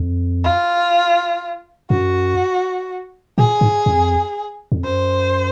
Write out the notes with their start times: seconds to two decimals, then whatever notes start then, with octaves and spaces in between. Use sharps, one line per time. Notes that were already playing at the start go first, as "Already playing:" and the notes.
Already playing: F2
0.44 F4
1.90 F#2 F#4
3.38 A#2 G#4
3.61 G#2
3.86 F2
4.72 F2
4.84 F#2 C5